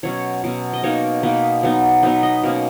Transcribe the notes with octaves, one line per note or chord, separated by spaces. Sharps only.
B2 F#3 C#4 C#5
B2 F#3 C#4
D#5
B2 A#3 D#4 C#5
B2 A#3 D#4 B4
F#3 B3 D#4
F#3 B3 D#4 B4
D#5
B2 A#3 C#4